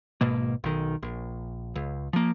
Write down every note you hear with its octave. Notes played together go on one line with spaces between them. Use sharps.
G#1 G#2 B2 A#3
B1 D#3
A#1
C#2
F3 A#3